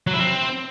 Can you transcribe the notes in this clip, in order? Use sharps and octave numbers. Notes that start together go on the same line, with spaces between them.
F#3
E4
C4